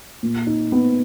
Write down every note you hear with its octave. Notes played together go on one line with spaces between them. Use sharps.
A#2
D#4
B3